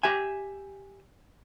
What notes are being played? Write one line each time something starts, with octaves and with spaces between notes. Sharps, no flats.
G4 E5 G#5